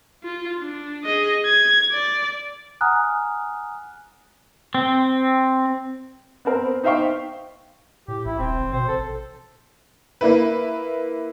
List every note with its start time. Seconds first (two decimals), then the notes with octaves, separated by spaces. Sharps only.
0.24 F4
0.59 D4
1.05 G#4 D#5
1.45 G#6
1.92 D5
2.81 F#5 G#5 A#5 D#6 F6 F#6
4.75 C4
6.45 B3 C4 A#4 C5
6.84 D#4 C5 E5 F5 G5 C#6
8.08 A2 G4
8.25 A1 E4
8.39 D#1 C4
8.60 G#1
8.73 B2 C5
8.88 A1 A4
10.21 A#3 E4 B4